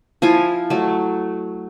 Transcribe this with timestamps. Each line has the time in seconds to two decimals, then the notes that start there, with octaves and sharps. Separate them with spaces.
0.22 F3 E4 F4 G#5
0.70 F#3 A3